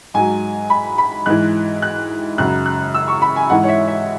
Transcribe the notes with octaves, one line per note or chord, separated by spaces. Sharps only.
G#2 F#3 G#5
B5
B5
G#2 E3 F#6
F#6
F#2 C#3 F#3 F#6
F#6
E6
C#6
B5
G#5
G#2 E3 F#5
C#5
E5
E5